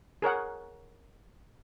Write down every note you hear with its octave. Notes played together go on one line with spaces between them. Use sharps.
G#4 A#4 C#5 F#5